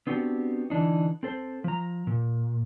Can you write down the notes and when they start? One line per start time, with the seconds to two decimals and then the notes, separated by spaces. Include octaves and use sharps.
0.07 B3 C4 D4 F#4 G4
0.70 D3 E3 D4 D#4
1.23 C4 A4 C5
1.64 F3 A#5
2.07 A#2